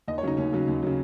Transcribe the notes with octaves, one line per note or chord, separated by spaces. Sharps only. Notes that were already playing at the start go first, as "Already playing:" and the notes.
D#2 D#5
C#5
C#3 F#3 D#4
D#2 C#4
C#3 F#3
D#2
C#3 F#3